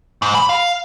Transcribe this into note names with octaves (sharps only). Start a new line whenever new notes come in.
G#2
B5
F5